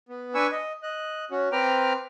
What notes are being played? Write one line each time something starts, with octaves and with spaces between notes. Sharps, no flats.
B3
D4 B4 G#5 C#6 E6
D#5
D#5 F#6
C#4 F#4
C4 B4 G5 A#5 D6 F6